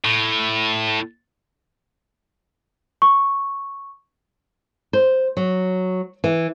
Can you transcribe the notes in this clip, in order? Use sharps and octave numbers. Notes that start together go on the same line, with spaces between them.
A2
C#6
C5
F#3
E3